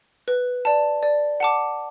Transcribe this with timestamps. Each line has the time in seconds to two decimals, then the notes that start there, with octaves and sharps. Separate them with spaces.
0.28 B4
0.65 D5 A5
1.03 D5
1.40 F#5 A5 D6